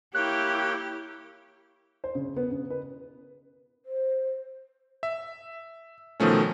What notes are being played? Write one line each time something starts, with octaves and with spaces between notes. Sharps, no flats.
A#3 E4 G4 C#5 G5 F#6
C5
C#3
B3
C#3
B4
C5
E5
B2 D#3 F3 A3 C#4